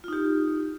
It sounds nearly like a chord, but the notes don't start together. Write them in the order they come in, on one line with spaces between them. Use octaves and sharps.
F4 D#4 G4